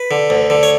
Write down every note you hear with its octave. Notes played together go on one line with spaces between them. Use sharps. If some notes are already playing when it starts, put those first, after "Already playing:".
Already playing: B4
D3
D2
D3
C#5